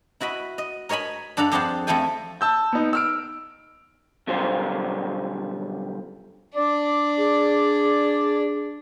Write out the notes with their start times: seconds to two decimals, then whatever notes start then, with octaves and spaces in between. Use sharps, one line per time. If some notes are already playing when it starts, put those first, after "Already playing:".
0.21 E4 F#4 D#5 B5
0.58 D#5
0.89 A#4 C#5 D#5 G#5 B5
1.37 G2 D4 A4 F#5 A#5
1.51 F2 G4 G#4 C5 F#5 A5
1.87 F2 A3 E4 A4 G5 G#5
2.41 A5 E6 G6
2.73 B3 D#4
2.93 E6 F6 D7
4.27 F#2 B2 D3 G3 F4 C5
6.55 D4 D5
7.18 G#4